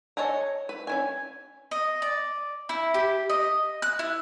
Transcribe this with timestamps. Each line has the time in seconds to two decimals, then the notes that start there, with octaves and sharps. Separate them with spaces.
0.17 A4 C#5 D#5 G#5 A#5
0.69 B4
0.87 C#4 E4 G#5
1.71 D#5
2.02 D5
2.69 E4
2.94 G4
3.30 D#5
3.82 F#6
3.99 E4